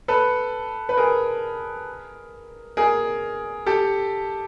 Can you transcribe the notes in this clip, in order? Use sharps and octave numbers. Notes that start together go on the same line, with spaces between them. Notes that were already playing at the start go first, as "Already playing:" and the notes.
A4 B4
B4
G#4 A#4
G#4 A#4
G4 A4